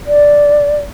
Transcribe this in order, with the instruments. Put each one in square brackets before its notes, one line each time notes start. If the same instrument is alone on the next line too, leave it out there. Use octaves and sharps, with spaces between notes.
[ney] D5